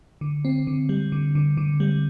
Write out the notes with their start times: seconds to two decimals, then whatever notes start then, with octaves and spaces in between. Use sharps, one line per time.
0.21 D3
0.45 C4
0.67 D3
0.89 G3
1.12 D3
1.35 D3
1.57 D3
1.80 G3